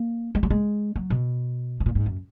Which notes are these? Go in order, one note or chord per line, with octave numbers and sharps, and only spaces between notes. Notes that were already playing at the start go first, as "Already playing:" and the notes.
Already playing: A#3
G#3
F#3
G#3
F#3
B2
B2
A#2
G#2
F#2